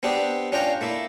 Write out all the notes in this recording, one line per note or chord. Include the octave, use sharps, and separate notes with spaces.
B3 C4 D4 G4
C#4 D4 F4 G5 A#5
A3 A#3 E4